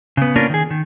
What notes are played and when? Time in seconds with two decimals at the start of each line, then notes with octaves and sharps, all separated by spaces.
0.17 C#3 B3
0.36 A#3 B3 C#4 D4 F4 A#4
0.50 D#3 G#4
0.70 D#3